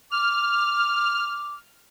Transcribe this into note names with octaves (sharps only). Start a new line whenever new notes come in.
D6 F6